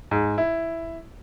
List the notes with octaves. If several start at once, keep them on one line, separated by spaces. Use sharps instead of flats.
G#2
E4